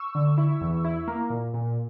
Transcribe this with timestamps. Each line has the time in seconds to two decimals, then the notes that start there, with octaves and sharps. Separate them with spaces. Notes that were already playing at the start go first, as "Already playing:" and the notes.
Already playing: C#6 E6
0.15 D3
0.38 E4
0.61 E2
0.84 E4
1.08 A#3
1.30 A#2
1.54 A#2